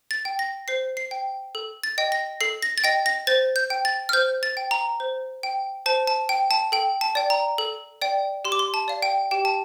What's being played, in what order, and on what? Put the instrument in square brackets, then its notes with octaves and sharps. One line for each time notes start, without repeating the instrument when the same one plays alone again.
[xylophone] A6
G5
A#6
C5 C7
C7
G5
A4
A6
D#5 G5
A#6
A4 C7
A#6
A6
D#5 G5 A#6
A#6
C5 A6
G6
G5
A6
F6
C5 G6
A6
G5
A#5
C5
G5
C5 A5
A5
G5
A5
A4 G5
A5
D5 G5
A#5
A4
D5 G5
G4 C6
D6
C6
A5
D5 F5
G5
G4 G5
A5